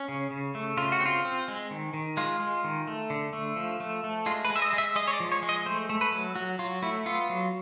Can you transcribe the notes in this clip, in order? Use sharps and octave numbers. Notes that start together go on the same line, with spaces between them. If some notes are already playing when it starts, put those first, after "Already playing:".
Already playing: C#4
C#3
C#3
A3
C#3 F4
F#4
C4 F4
C4
G#3
D#3
D#3
G#3 F4
G#3
D#3
A3
D3
A3
F3
A3
A3
G#3 F4
B4
G#3
E5
D#5
G#3
E5
G#3 D#5
C#5
D5
F3
C#5
G#3
D#5
A3 C5
A3
B4
F#3
F#3 F#4
F#3 F4
A3 E4
B3 F4
F#3